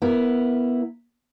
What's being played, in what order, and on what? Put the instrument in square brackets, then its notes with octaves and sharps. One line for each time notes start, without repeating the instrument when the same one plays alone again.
[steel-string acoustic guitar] B3 E4 A#4